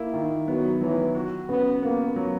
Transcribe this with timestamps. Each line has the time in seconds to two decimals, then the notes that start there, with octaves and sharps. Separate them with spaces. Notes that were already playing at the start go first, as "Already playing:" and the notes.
Already playing: A#3 E4
0.14 D#3
0.48 F#3 B3
0.81 E3 F#3
1.15 F#4
1.49 C#3 B3
1.82 A#3 B3
2.16 F#3